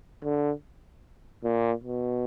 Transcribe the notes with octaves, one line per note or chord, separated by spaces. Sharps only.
D3
A#2
B2